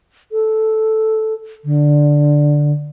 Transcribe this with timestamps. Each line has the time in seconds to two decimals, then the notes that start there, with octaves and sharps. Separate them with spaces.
0.32 A4
1.65 D3